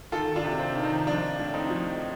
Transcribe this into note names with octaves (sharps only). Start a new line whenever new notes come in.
D#3 F4 A4
D4 F4
C3
C4
D#3
C4 D#4
F3 D4 F4
A2
C4 D#4
F3